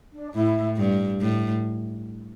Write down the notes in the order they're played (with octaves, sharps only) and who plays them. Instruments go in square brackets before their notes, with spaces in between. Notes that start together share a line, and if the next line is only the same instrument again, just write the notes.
[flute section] D4
[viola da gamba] A2 [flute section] E4
[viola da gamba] G2
A2